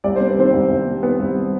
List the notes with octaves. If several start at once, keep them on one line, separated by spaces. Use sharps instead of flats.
C2 D5
C3 C5
B4
D#3 C4 C5
C2
C2
C3
D#3 B3 B4
C2